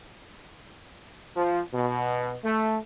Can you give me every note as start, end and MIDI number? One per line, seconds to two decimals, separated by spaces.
1.36 1.60 53
1.73 2.36 47
2.44 2.77 57